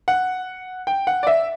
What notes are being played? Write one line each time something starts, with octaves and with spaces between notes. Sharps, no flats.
F#5
G5
F#5
D5
E5